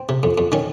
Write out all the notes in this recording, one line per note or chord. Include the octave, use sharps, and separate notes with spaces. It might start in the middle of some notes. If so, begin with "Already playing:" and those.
Already playing: C4
C3
F2
F2
D#3 C#4